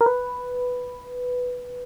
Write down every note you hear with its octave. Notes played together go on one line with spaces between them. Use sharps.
A#4
B4